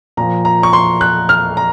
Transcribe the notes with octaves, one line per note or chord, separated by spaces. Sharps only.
A#2 F3 A#5
A#5
C#6
C6
F#6
F6
A#5